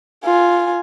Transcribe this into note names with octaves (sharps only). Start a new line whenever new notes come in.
F4 G#5